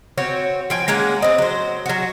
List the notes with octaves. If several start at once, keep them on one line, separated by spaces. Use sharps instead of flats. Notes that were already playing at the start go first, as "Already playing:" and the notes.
C4 F#4 C#5
F3 G5 G#5
G#3 A#3 C#4 F#5
C4 D#5
F#3 C5
F#3 F#4